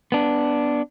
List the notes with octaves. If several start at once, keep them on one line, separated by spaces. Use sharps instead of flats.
B3 D4